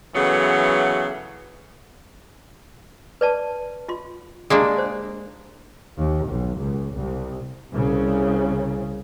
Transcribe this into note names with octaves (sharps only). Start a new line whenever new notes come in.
C#3 E3 F#3 A3 B3
B4 D5 A5
F4 C6
G#3 A#3 D4 G4
C5
D#2
B1
C#2
C2
C2 C#3